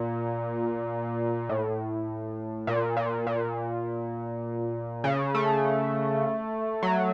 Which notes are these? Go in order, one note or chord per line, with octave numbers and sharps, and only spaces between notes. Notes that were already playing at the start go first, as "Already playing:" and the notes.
Already playing: A#2
A2
A#2
A#2
A#2
C#3
A3
F#3